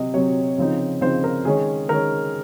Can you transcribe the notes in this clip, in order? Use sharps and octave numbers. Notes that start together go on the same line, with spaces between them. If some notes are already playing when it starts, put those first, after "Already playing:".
Already playing: C3 F#3 C4 D#5
C3 F#3 C4 C#5
C#3 F3 C4 D#4
C#3 F3 C4 D#4 C5
A#4
D#3 G#3 C#4 G#4
D#3 G#3 C#4 A#4